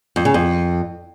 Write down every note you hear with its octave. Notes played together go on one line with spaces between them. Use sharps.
F2
C#3
F2